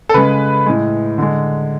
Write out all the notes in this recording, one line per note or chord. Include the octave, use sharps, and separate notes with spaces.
A4
C#3 G#3 B4
A2 G#3
D3 G#3